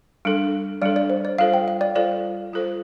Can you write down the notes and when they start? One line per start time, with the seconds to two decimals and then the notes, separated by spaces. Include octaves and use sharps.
0.25 G3 D4 A4
0.82 G3 D4 A4 D5
0.96 D5
1.10 C5
1.25 D5
1.39 G3 F4 A4 C5 F5
1.54 G5
1.68 F5
1.81 D5
1.95 G3 F4 A4 C5 D5
2.53 G3 F4 A4 C5